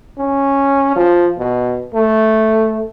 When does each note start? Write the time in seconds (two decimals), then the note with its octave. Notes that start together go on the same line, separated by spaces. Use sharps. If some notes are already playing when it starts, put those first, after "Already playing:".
0.18 C#4
0.96 F3
1.38 B2
1.94 A3